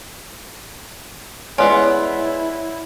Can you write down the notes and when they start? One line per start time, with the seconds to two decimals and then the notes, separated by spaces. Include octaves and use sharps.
1.58 G#3 B3 C#4 E4 C#5 D5 C6